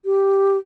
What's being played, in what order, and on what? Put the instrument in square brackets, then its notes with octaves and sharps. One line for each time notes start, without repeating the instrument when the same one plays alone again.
[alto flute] G4